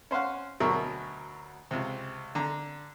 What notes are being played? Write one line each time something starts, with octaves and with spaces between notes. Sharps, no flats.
C#4 C5 F5 F#5
D2 B2 F#3 A#4 E5 C#6
C#2 C3
D3 A#5